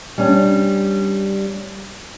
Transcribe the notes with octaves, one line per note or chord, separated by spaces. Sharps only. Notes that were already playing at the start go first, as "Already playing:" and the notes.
G3 C#4 D4